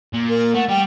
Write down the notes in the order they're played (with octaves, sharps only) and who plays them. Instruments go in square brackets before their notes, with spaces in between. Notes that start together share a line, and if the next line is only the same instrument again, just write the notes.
[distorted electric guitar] A#2
[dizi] A#4
[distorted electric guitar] A3 [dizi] F#5
[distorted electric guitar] G3 [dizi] G5